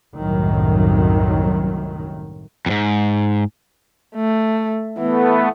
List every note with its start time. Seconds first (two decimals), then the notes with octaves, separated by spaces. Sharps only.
0.16 C2 F#2 A2 D#3 F#3
2.66 F2 G#2
4.15 A3
4.98 E3 A3 B3